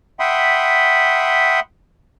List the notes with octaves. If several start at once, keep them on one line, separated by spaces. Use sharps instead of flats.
E5 F#5 G5 B5 C6 D#6